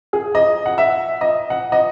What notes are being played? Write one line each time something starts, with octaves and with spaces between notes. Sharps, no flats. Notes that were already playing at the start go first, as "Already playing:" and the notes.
G#4
D#5
F#5
E5
D#5
F#5
D#5